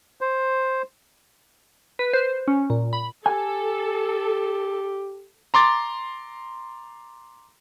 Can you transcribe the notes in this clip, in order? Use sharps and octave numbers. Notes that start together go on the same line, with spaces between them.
C5
B4
C5
C#4
A#2
B5
G4 A4 G#5
A#5 C6 D6 A6